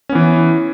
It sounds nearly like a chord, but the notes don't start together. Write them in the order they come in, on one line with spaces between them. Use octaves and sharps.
C#4 B3 E3